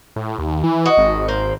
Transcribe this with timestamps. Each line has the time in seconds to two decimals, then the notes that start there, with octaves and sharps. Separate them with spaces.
0.16 A2
0.38 D#2
0.64 E3
0.86 F#4 D#5
0.97 G#1
1.28 A#3 C5